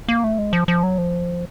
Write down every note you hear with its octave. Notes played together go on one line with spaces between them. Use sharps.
A#3
A3
G#3
F3
F3
F#3
F3